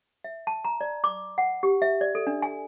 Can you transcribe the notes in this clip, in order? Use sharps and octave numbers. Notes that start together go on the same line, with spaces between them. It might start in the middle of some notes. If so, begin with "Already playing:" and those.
E5
A5
A#5
D5
D6
F#5
G4
E5
D5
A4
D4
G#5